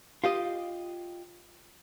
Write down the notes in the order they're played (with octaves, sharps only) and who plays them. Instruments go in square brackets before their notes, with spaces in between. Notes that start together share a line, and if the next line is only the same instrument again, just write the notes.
[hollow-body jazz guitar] F4 G4 D#5